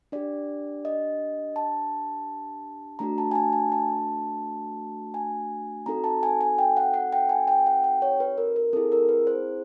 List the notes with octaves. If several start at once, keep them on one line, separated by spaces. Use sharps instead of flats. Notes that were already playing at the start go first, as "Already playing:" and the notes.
D4 G4 D5
D#5
A5
A3 D4 F#4 A#5
A5
G#5
A5
G#5
A5
G#5
C4 D#4 F#4 A4 A#5
A5
G#5
G#5
G5
F#5
F#5
G5
G#5
G5
F#5
G5
C#5
B4
A#4
A#4
C4 E4 G#4 A4
A#4
B4
C5